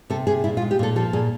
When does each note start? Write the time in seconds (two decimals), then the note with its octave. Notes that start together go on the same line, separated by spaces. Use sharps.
0.10 C3 A4
0.27 C3 G#4
0.44 A#2 E4
0.57 F4
0.62 G#3
0.71 G4
0.79 A#2 A4
0.96 F3 A4
1.13 A#2 G#4